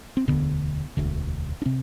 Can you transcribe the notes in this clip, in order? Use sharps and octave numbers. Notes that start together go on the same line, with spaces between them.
C4
E1 D2 B2 D3 B3
E1 D2 D3
D4
C3 C4